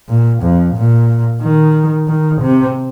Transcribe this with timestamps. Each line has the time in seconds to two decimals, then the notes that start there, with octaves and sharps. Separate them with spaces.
0.09 A#2
0.42 F2
0.75 A#2
1.42 D#3
2.08 D#3
2.41 C3